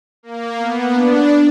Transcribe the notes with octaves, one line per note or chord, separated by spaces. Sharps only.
A#3
B3
D4